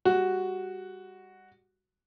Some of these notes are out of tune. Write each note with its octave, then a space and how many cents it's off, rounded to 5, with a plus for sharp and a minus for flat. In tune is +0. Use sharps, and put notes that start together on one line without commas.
G3 +25 F#4 +0